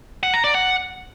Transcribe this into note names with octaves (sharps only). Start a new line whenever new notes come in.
F#5
A#5
D5
F#5